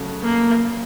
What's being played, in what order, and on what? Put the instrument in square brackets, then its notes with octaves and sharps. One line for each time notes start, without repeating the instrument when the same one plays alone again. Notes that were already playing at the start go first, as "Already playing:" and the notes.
Already playing: [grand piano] C#3 F#3 A3
[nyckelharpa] A#3